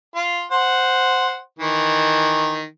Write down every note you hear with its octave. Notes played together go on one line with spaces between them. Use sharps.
F4
C5 F#5
D#3 E3